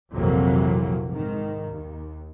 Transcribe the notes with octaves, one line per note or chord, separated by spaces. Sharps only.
A#1 F2 C3 E3 F#3 A#3
G#2 D#3
D#2